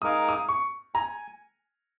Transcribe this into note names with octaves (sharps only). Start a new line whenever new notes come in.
G#3 D#4 A#4 F5 G#5 D#6
D#6
C#6
G#5 A#5